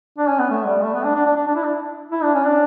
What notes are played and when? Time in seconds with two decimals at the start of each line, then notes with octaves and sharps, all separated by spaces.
0.18 D4
0.29 C#4
0.39 B3
0.50 A3
0.66 G3
0.82 A3
0.93 B3
1.04 D4
1.15 D4
1.26 D4
1.36 D4
1.47 D4
1.55 E4
1.63 D4
2.11 E4
2.23 D4
2.34 C#4
2.45 D4